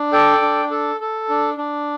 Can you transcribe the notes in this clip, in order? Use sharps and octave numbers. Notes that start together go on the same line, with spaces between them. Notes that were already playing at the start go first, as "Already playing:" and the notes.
Already playing: D4
A4 D5 G5
D4
A4
A4
D4
D4